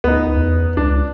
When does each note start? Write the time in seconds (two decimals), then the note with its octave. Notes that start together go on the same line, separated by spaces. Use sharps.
0.04 D2 B3 D#4
0.35 E2
0.77 C#2 D4